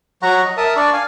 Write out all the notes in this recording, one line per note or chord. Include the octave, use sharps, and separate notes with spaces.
F#3 F#5 A#5 C#6
D#5
A#4 E5 A5 D#6
D4 D5 C#6
F5 G#5